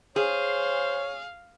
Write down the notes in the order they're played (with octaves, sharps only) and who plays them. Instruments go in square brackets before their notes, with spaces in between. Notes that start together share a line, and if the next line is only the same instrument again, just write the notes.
[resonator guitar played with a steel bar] G#4 [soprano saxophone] C5 [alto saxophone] C#5 [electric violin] F5